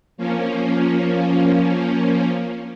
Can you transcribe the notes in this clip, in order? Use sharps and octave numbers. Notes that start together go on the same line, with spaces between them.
F3 A#3 C#4